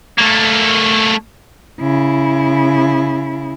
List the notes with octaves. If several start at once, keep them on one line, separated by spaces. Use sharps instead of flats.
A3 A#3
C#3 E4